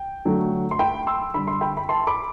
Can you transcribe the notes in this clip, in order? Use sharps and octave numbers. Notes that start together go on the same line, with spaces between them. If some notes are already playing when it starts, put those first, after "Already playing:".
Already playing: G5
D3 F#3 A3
C6
G5 B5
C6 E6
D3 G3 B5
C6
G5 B5
B5
A5 C6
B5 D6